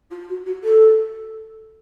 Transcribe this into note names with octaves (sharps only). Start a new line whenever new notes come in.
F4
F#4
F#4
A4